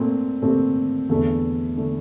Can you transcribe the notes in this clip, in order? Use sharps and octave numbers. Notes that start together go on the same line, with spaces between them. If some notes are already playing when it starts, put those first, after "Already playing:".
Already playing: A#2 A3 C4
A#2 A3 C4 G4
E2 D3 A3
D3 A3